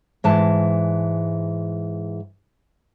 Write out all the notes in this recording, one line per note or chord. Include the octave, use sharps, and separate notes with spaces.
G#2 E3 A5